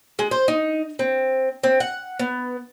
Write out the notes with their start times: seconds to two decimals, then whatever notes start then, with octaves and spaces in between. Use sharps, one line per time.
0.19 G#3
0.31 C5
0.48 D#4
0.99 C4
1.64 C4
1.80 F#5
2.19 B3